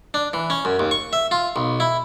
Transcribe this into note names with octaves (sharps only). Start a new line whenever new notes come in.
D4
E3
C#4
F#2
D#2
C#6
E5
F4
B1
E4